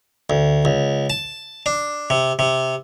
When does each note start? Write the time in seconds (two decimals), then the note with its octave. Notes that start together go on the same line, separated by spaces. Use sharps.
0.30 D2
0.65 C#2
1.10 A5
1.66 D4
2.10 C3
2.39 C3